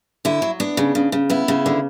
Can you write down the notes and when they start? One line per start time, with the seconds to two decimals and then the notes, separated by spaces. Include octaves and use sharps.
0.25 D3 E4
0.42 F#3
0.60 B3 D4
0.77 C#3
0.95 C#3
1.12 C#3
1.30 B3 E4
1.48 C#3
1.66 D3